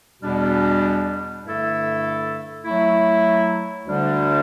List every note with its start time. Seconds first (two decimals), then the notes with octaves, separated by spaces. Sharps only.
0.21 E2 B2 G3 D4
1.43 G2 D3 A3 E4 A4
2.64 F#3 A3 E4
3.86 D2 D3 G3 D4